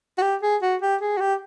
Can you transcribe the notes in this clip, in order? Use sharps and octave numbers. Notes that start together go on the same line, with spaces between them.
F#4
G4
G#4
F#4
G4
G#4
F#4
G4